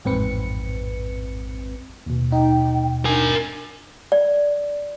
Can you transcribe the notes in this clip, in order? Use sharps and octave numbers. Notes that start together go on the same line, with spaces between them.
A1 F2 G#2 C4 B4 C#7
D#2 B2
D#4 G5
D4 A#4 G#5
D5